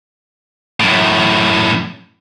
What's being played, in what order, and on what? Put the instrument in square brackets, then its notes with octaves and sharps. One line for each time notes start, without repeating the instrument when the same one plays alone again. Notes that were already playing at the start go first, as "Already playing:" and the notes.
[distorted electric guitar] F#2 A2